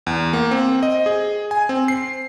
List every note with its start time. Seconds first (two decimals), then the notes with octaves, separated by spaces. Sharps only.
0.07 E2
0.33 A#3
0.51 C4
0.83 D#5
1.06 G#4
1.51 G#5
1.69 C4
1.88 C7